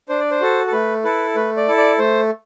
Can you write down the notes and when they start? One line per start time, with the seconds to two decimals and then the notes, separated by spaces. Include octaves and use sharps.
0.09 D4 C5
0.20 D5
0.31 C5
0.41 F#4 A4
0.67 A4
0.72 A3 B4
1.04 E4 A4 B4
1.36 A3 B4
1.57 D5
1.67 E4 A4
1.78 D5
1.99 A3 C5